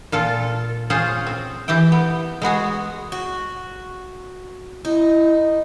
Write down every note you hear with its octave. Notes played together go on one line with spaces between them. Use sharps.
A#2 F4 A4
C#4 F4 G#4 C5
C4
E3 G4 E5 G5
B3
G#3 B3 F#4 G#4
F#4
D#4 E4